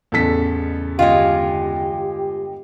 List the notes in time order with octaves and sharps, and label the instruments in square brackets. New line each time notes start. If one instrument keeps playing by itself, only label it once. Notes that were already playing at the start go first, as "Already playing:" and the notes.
[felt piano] A1 B6 [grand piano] E2 C#3 A4
[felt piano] G1 D#5 [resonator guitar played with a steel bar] G#3 F4 [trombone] G4